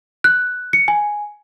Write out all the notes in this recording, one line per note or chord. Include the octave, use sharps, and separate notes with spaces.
F#6
C#7
G#5